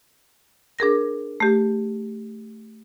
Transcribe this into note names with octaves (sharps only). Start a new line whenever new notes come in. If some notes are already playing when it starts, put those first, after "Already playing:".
D4 G#4 A#4 A#6
A3 G4